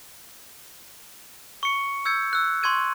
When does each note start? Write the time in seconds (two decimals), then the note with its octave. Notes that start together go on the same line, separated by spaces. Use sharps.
1.63 C#6 C#7
2.05 E6 G6 G#6 C#7
2.33 E6 F#6
2.63 C6 C#6 G#6 D#7